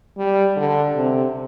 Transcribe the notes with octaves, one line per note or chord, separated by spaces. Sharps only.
G3
D3
C3